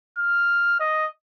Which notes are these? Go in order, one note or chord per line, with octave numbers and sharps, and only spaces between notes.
F6
D#5